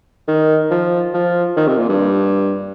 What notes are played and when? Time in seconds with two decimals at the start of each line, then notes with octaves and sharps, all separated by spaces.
0.28 D#3
0.70 F3
1.14 F3
1.57 D#3
1.68 C3
1.78 A#2
1.89 G2